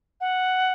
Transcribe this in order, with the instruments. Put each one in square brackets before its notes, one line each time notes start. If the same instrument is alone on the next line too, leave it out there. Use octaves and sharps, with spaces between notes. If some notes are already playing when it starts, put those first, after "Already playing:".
[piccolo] F#5